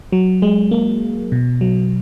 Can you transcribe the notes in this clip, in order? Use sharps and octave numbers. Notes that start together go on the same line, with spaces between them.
F#3
G#3
A#3
B2
F#3